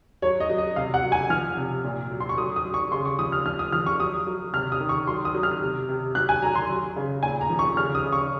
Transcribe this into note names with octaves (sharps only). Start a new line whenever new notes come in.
F#3 C#5
D#5
F#3
D#5
C3 F5
F#5
F#3
G#5
F3 F6
C3
A#2
F#3
C6
C#6
F#3 D#6
D#6
F#3
C#6
C#3 C6
C#6
F3 D#6
F6
F3 F6
D#6
F3 F6
C#6
F#3 D#6
F#3
C3 F6
D#6
D#3
C#6
F#3 C6
D#6
F#3
F6
C3
C3
F#3 F#6
G#5
F#3 A#5
C6
F#3
C#3
A#2 G#5
A#5
F3
C#6
C#3 F6
D#6
C#3
C#6